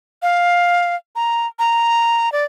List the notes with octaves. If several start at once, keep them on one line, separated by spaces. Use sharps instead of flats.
F5
A#5
A#5
D5